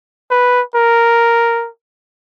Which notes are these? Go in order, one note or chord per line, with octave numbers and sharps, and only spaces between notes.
B4
A#4